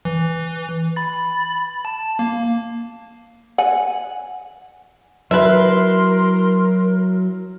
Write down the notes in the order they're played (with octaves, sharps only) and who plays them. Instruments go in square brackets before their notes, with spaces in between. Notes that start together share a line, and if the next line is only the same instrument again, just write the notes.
[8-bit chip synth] E3
B5 A6
A5
A#3
[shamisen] F#5 G#5
[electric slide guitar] F#3 E4 [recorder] A#4 [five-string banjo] B4 E5 [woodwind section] C6